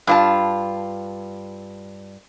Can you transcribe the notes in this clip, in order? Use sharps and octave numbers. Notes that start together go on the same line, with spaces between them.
G2 F4 A5